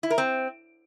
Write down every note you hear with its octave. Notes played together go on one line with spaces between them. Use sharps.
E4
A#4
C4